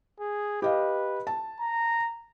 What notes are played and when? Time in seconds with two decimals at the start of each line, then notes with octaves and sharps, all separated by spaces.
0.20 G#4
0.62 G4 B4 D#5 F5
1.27 A5
1.60 A#5